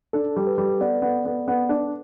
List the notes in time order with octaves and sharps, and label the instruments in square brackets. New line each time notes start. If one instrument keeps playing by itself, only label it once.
[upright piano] D4 [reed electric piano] A4
[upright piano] G3
[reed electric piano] B4
[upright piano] G3
[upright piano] B3 [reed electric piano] D5
[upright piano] B3
B3
B3
D4